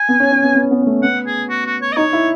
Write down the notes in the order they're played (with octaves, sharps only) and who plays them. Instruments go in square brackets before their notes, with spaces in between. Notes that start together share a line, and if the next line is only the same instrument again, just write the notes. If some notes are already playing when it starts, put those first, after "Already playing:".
Already playing: [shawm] G#5
[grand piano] B3
C#4
C#4
B3
B3
B3
B3
A3
[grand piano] B3 [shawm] F#5
[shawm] G#4
F#4
F#4
C#5
D#5
[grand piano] D#4 [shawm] C#5
[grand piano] E4